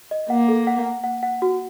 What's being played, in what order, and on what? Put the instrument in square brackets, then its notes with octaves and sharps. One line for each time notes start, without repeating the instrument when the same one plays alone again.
[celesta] D#5
[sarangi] A#3 [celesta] F#5
[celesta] A4
F#5
F#5
F#5
F#5
F#4